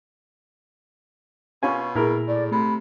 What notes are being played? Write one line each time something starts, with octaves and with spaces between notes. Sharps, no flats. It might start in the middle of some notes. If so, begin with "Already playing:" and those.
B2 C#4 F4 G#5
A#2 E4 G#4 A#4
A2 D5
C3 A3 B5